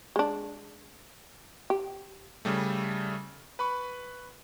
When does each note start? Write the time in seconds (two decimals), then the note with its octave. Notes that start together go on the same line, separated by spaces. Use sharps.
0.16 G#3 D4
1.70 G4
2.45 C#3 G3 A3
3.59 B4 B5 C#6